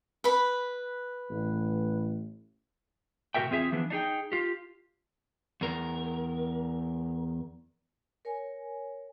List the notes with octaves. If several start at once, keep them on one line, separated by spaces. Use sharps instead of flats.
B4 B5
A1
A2 C3 F#4 A#4 E5 G5
E2 C4 F4 G#4 E5
E3 F3 B3 D4
D4 D#4 G#4 G5
F4 G4
E2 A#4
A#4 C#5 G#5